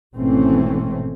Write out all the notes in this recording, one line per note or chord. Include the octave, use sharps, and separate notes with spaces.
G#1 B2 E3 A3 C4 C#4